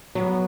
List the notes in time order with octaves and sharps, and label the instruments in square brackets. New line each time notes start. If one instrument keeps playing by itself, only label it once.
[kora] F#3 [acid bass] B3